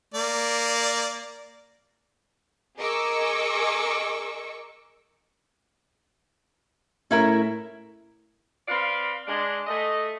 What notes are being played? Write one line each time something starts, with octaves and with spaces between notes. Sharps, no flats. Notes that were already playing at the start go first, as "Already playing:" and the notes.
A#3 D5
G#4 A#4 D#5 C#6 D6 E6
A2 C#4 E4 A#4
C4 B4 D5 F5
G#3 D4
A3 D#5